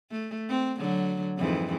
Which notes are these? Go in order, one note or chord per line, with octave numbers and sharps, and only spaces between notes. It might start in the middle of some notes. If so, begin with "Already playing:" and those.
A3
C4
D3 F#3
F2 G#2 E3